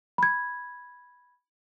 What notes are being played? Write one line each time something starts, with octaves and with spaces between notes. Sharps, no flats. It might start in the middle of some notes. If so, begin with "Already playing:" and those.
B5 G#6